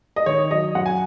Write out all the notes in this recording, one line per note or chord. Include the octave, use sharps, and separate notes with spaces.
D#5
D#3 C#5
F#3 D#5
F#2 F#5
G#5